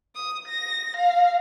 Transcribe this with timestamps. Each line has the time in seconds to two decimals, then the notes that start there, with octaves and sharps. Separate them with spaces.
0.15 D#6
0.48 A#6
0.97 F5